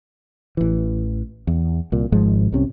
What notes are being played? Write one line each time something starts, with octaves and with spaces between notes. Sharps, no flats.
A1 E3
E2
C2 A#2
G#1 G#2 F3 G#3
C2 C3 C#4